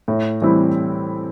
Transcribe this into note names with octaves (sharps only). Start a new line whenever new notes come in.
A2
E3 G3 C4 E4